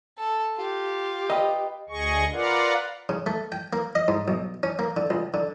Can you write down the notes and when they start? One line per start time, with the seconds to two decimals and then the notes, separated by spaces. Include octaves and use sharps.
0.18 A4
0.57 F4 G4
1.30 B4 D#5 G5
1.89 D2 G#4 D#5 C#6
2.33 F4 A#4 B4 D5 F5 F#5
3.09 C#3
3.26 A3
3.52 G5
3.73 A#3
3.95 D#5
4.08 G#2
4.28 B1
4.63 C#4
4.79 A#3
4.97 D3
5.10 C#2
5.34 D3